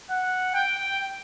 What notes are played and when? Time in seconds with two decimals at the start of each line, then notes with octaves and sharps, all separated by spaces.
0.10 F#5
0.54 G5